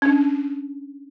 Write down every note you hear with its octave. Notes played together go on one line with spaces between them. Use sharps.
C#4 D4